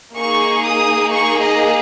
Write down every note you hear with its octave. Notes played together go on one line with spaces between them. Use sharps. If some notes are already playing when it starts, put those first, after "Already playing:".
A#3 D#4 G#4 C#6
D#6
C#6
D#5